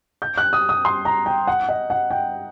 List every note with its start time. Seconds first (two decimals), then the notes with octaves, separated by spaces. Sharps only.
0.22 G6
0.38 F#6
0.53 D#6
0.69 D#6
0.85 C6
1.05 A#5
1.26 G5
1.47 F#5
1.69 D#5
1.90 F#5
2.11 G5